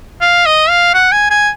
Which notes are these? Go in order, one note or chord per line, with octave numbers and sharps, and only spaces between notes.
F5
D#5
F5
F#5
G#5
G#5